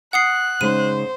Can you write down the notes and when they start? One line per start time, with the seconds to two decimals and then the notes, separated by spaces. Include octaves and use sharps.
0.13 F#5 D#6 F#6 C7
0.61 C#3 G#3 D#4 C5 D#7